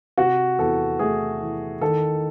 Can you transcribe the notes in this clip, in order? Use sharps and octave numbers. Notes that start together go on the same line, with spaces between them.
C3 F#4
E2 A4
A3 G#4
E3
D#3 A4